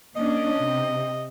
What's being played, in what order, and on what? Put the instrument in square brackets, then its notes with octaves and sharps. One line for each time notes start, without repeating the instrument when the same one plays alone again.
[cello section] A#3 C#4 D4 [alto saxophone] D#5
[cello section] C3